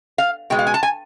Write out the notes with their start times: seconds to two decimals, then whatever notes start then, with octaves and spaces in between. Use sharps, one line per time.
0.18 F5
0.50 B2 G#3 G5
0.59 F5
0.67 G#5
0.74 A5
0.83 G#5